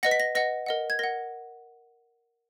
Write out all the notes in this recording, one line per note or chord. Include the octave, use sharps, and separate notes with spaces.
B4 D#5 F#5 A#6
B6
A#6
B4 D#5 F#5 A#6
A#4 D#5 F#5
G#6
A#4 D#5 F#5 A#6